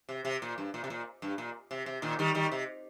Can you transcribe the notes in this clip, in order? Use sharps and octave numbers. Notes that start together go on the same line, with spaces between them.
C3
C3
A#2
G2
A#2
C3
A#2
G2
A#2
C3
C3
A#2 D#3
D#3 G3
D#3 G3
C3